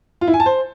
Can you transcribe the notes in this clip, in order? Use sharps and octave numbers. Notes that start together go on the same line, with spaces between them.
F4
E4
G#5
A5
C5